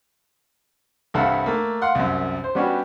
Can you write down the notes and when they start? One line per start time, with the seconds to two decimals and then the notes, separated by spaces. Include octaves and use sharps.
1.14 C2 G2 A4 F5 F#5
1.46 A3 A#3
1.82 F5 F#5 C6
1.95 C2 F#2
2.44 C5
2.55 G3 B3 C#4 D4 F#4 G4